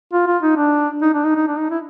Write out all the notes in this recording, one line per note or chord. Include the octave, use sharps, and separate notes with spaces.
F4
F4
D#4
D4
D#4
D4
D#4
D#4
D4
D#4
E4